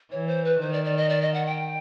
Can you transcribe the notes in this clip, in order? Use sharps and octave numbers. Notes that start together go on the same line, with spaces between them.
E3 C#5
C5
B4
D#3 C5
D5
D5
D#5
D5
D#5
F#5
G5